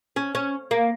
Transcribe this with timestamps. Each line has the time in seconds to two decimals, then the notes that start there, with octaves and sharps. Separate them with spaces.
0.16 C#4
0.35 C#4
0.71 A#3